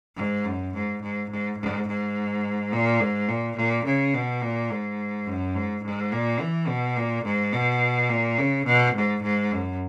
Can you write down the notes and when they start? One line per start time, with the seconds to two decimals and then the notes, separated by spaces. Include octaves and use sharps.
0.17 G#2
0.45 F#2
0.74 G#2
1.02 G#2
1.30 G#2
1.59 G#2
1.88 G#2
2.72 A#2
3.01 G#2
3.28 A#2
3.56 A#2
3.85 C#3
4.14 B2
4.42 A#2
4.71 G#2
5.26 F#2
5.55 G#2
5.83 G#2
6.12 A#2
6.40 E3
6.68 B2
6.97 A#2
7.24 G#2
7.53 B2
8.09 A#2
8.38 C#3
8.66 B2
8.94 G#2
9.23 G#2
9.51 F#2